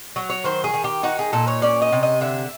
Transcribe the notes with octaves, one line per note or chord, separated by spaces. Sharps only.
F#3
C#5
D#3 C5
G#4
D#3
G4
D#4 F#4
G#4
A#2 A4
C#5
C#4 D5
D#5
C3
D#5
D3 E5